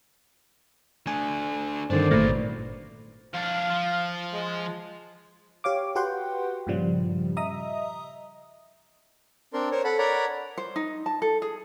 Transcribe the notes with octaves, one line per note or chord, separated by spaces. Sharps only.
A3 D4 G#5
G2 D3 D#3 C4 D4 C5 D5
G#1 A#2 F#3 A3 B4
F2 D4 F5
F3
G#3
G4 C#5 F5 D6
F#4 G4 B4 F#5 G5 C6
G2 A#2 C#3 F3 G3
D#5 E5 A#5 D#6
C4 D4 A#4 C6
A#4 C5 C#5
A4 F#5 B5
A#4 C#5 D5 F#5 A#5 B5
C5
D#4
A5
A4
G#4